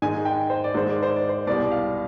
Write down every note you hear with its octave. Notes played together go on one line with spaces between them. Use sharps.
G#2 D#3 G#3 G#5
G5
C5
D5
G#2 D#3 G#3 C5
D5
C5
D5
C5
C2 B2 G3 D5
F5